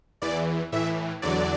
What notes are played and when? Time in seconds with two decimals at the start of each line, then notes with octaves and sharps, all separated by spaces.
0.22 E2 E3 D5
0.72 A2 E3 E5
1.22 E2 D3 F#3 D5